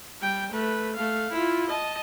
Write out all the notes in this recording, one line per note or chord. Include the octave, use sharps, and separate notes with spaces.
G3 G5
A3 B4
A3 F5
E4 F4
D#5 A5